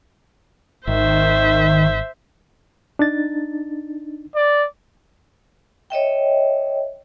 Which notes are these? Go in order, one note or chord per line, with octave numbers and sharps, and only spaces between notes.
G#1 D#3 C5 E5
D4 D#4 A6
D5
C#5 D#5 E5 G5